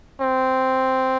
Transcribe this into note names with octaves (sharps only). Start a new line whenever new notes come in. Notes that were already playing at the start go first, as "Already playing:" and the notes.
C4